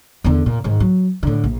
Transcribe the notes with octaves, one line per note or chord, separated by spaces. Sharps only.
E2 D3
A#2
G#2 D#3
F#3
A2 D3
A#1